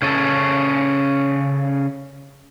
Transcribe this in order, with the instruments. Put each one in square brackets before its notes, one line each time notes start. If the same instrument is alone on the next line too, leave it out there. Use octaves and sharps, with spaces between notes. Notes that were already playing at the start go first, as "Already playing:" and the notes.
[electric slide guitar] C#3 C#4 A4